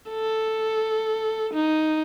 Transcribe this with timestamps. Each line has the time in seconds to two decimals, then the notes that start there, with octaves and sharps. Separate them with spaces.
0.10 A4
1.54 D#4